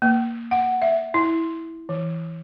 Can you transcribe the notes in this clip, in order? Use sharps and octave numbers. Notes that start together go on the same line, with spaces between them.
A#3
F#5
E5
E4
E3